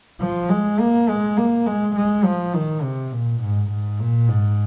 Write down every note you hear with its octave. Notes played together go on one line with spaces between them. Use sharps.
F3
G#3
A#3
G#3
A#3
G#3
G#3
F3
D#3
C3
A#2
G#2
G#2
A#2
G#2